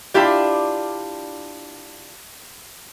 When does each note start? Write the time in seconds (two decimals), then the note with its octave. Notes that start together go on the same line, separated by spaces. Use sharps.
0.14 D4 E4 F4 G4 D5